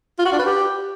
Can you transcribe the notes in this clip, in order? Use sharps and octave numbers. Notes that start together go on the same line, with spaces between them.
F4
F#4
D4
B4
G4